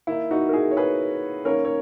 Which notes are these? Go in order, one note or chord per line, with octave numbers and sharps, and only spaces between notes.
D#3 A#3 D#4 E4
D#4 F#4
A#4
E4 G#4
C#5
G#4 B4
D#3 A#3 C#4 A#4 C#5
C#5